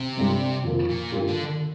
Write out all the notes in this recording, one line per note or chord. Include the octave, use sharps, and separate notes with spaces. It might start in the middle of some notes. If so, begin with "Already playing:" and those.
Already playing: C3
G1 G2 G3
F2 F3 A#3
A#2
G1 G2 F3 A#3 G4
D3